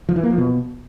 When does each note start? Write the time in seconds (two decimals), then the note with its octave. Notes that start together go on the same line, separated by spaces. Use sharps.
0.09 F3
0.16 E3
0.23 A#3
0.31 F3
0.38 B2